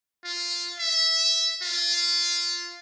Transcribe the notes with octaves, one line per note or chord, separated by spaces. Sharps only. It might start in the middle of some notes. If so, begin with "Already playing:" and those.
F4
E5
F4